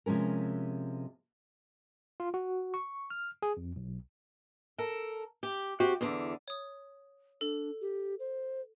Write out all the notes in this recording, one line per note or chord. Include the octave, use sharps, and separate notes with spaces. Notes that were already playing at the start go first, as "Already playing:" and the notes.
C3 F3 G#3 C#4 A#4
F4
F#4
C#6
F6
G#4
F2
B1
A4 A#4
G4
C4 F#4 G4
E2 D3
C#5 D#6
D4 A4
G4
C5